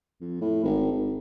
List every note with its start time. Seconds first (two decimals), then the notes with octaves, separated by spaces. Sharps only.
0.21 F2
0.41 A2
0.64 G#1
0.92 G#1